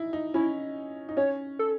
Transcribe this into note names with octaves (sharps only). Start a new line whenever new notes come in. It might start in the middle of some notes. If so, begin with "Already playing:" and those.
Already playing: D#4 E4
D#4
C#4 E4
D#4
C#4 C#5
A4